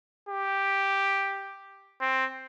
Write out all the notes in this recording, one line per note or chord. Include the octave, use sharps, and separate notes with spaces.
G4
C4